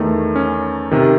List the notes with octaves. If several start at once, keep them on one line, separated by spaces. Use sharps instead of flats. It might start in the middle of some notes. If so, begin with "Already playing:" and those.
Already playing: E2 D#3 A3
C#4
C3 D#3